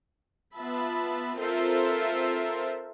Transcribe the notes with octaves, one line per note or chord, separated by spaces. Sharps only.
B3 F4 E5 A5 B5
C4 F4 A4 A#4 C5 E5